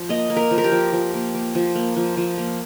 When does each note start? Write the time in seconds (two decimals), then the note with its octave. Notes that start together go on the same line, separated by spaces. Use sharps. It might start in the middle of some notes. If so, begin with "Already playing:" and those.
Already playing: F3
0.09 A#3 D#5
0.30 A#3
0.37 A#4
0.51 F3
0.58 A#4
0.64 G4
0.72 F3
0.92 F3
1.14 A#3
1.34 A#3
1.55 F3
1.75 A#3
1.96 F3
2.17 F3
2.38 A#3